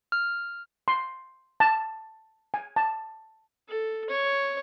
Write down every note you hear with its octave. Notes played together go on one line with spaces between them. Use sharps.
F6
C6
A5
G#5
A5
A4
C#5